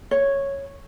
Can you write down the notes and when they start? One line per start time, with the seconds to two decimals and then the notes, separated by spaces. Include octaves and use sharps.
0.11 C#5